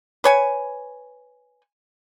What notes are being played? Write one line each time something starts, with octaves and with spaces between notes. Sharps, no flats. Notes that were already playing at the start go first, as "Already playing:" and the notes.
B4 C#5 G#5